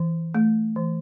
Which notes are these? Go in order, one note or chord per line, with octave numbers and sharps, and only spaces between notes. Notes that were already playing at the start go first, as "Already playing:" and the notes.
Already playing: E3
A3
E3